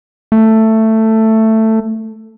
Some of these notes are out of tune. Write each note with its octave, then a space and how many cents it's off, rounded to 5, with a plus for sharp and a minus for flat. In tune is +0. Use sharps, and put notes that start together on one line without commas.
A3 +10